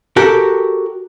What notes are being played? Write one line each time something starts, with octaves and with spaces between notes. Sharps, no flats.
F#4 G4 A4 A#4